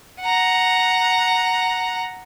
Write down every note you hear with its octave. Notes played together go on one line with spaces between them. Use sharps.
F#5 A#5